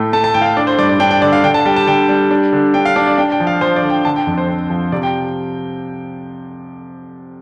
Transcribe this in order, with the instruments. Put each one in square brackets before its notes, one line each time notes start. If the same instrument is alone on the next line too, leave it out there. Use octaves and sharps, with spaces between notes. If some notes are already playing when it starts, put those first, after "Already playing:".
Already playing: [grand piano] A2 A3 G5
A3 A5
A5
A2 G5
F5
G5
D4 D5
C5
G2 D5
D5
D4 G5
G5
D3 D5
F5
D3 G5
A5
G3 G5
A5
D3 G5
G3
D4
D3
D4 G5
F5
D4 D5
D5
D4 G5
G5
F3
F5
F3 C5
D5
D3
G5
D3 A5
G5
F2
C5
C4
F3
C3 D5
G5